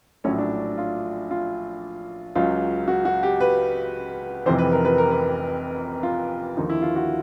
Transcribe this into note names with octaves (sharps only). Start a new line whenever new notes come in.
A#1 A2 F#3 C#4
D4
F4
F4
C#2 C#3 F#3 F4
F#4
F#4
G4
B4
F1 F2 C3 E3 C5
B4
A#4
B4
A#4
B4
F4
D#2 D3 F3 D#4
E4
F4
F#4